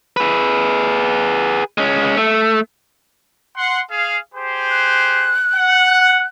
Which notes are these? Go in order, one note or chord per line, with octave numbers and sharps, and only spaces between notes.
G#4 B4
G#3 C#4
A3
F#5 C6
G#4 F5
G4 G#4 C5
F#6
F#5